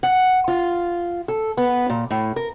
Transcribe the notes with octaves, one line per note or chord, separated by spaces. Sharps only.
F#5
F4
A4
B3
A#2
A2
A#4